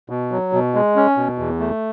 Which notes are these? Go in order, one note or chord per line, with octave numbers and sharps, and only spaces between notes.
B2
F#3
B2
G#3
C#4
B2
E2
A3